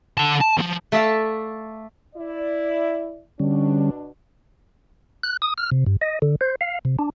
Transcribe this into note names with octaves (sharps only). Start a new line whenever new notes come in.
D3 A5
A5
D#2 F3
A3 A4 D5 E5 F5 A5
E4 D5
B2 D3 G3 C#4 D4
F#6
D#6
F6
C3
G2
D#5
D3
C5
F5
C3
D4